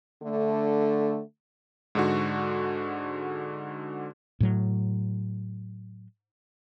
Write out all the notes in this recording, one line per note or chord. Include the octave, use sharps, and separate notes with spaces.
D3 A3
G#2 D3 F#4
A2 F#3